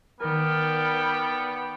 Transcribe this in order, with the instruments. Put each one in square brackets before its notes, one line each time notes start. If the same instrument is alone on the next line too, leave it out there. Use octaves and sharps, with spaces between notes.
[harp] D#3 A#4 [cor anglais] B3 [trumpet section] D5 G5 [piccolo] F6